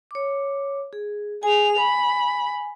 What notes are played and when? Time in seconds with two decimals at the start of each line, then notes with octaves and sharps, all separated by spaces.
0.11 C#5 D6
0.93 G#4
1.43 G#4 G#5 F7
1.79 B5